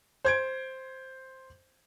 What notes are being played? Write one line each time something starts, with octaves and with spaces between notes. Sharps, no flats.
C5 G#6 D7